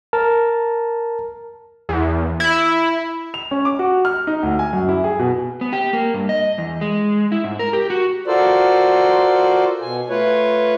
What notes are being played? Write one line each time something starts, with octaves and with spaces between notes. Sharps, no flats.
A#4 A5
E2
E4
F7
C#4
D6
F#4
F6
D#4
D2
G#5
F#2
E4
G#4
B2
B3
G4
A#3
G2
D#5
E2
G#3
E4
G#2
A#4
G4
F#4
F4 F#4 A4 A#4 C5 D5
B2 G#5
A3 F4 B4 C#5